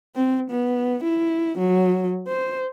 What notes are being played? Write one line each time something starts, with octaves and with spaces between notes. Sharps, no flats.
C4
B3
E4
F#3
C5